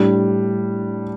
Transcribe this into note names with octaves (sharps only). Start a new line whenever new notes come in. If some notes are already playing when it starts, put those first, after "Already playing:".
Already playing: A2 G3 D4